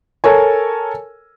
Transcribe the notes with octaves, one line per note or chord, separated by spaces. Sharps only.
A4 A#4 C#5 G#5